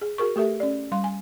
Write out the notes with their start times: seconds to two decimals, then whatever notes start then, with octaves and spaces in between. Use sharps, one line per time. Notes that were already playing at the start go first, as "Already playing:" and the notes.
0.02 G#4
0.18 F#4 G#4 A#4 C#6
0.36 A3 G4 A4 E5
0.60 C#4 D5
0.92 G3 F5 C6
1.04 G#5